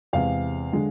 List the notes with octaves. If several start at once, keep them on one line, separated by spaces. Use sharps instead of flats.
E2 C3 G#3 F5
D3 G#3